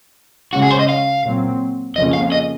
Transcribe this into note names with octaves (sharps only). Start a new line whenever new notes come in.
C#3 G#3 C#4 F#4
G#4
C5
D#5
F5
A#2 F#3 C4
F2 C#3 F3 A#3 C#4 D#5
F5
D#5